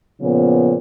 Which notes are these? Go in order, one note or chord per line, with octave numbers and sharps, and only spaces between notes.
A#2 C#3 F3 B3